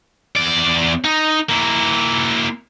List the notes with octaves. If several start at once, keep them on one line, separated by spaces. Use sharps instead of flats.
E2 D5
D#4
A#3 E4